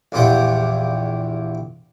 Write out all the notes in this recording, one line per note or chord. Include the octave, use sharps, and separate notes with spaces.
A#1 E2 F4 G4 F#5 G5